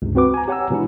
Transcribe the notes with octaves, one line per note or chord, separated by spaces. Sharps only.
C#2 G2 C3
C4 F#4 B4 D6
G#5 A#5
G4 C#5 F#5 G#5 A#5 E6
B2 E3 G#3 D4 E4